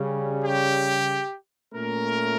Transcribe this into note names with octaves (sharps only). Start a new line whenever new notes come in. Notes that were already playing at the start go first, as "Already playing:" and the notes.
Already playing: C#3 G3 C#4
G4
A#2 A3 C#4 A#4